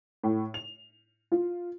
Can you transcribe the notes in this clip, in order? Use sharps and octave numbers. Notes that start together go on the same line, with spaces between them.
A2
F7
F4